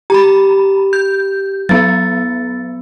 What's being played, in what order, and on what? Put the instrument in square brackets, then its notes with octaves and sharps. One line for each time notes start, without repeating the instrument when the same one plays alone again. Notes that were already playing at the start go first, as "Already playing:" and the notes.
[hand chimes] G4 [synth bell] A#5 B5
[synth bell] G6
[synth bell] F#3 B3 [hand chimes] A6